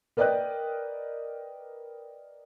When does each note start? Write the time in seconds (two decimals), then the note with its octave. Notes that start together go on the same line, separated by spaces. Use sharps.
0.17 A#4 B4 D5 D#5 G5 F#6